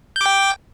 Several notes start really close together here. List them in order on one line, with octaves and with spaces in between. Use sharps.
G6 D6 G5